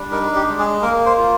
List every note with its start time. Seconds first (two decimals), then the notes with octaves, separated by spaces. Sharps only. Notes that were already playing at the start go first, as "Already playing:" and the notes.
Already playing: G3 D4
0.11 D#4 A#4
0.35 G4
0.47 G#3
0.59 G#4
0.82 A#3 A#4
1.06 C5
1.18 F4